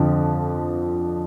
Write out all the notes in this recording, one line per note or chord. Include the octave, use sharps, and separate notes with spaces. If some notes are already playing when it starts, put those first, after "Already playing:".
Already playing: F2 D3 F3